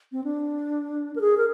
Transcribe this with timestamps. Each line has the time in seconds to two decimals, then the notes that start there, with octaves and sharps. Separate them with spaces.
0.12 C4
0.24 D4
1.16 A#4
1.21 G#4
1.38 A#4